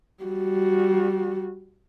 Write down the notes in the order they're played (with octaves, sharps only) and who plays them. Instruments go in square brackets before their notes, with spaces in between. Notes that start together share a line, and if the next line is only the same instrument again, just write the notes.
[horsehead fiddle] G3 F#4